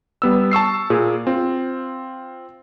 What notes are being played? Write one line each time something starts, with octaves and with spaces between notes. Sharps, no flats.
G3 B3 E6
A5 C#6 E6 C7
A#2 G#4
C4 F4